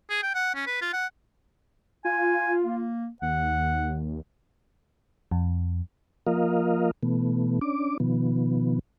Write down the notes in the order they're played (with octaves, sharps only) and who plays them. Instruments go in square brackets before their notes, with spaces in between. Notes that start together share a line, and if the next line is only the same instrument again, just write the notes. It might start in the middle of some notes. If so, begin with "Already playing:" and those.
[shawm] G#4
G5
F#5
C#4
B4
F4
F#5
[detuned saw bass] F4 [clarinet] G#5
[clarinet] A#3
[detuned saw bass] D#2 [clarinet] F#5
[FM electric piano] F2
[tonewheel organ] F3 A#3 F4 A#4 D#5 F5
B2 E3 A3 B3
C#4 D4 D6
B2 D#3 F3 B3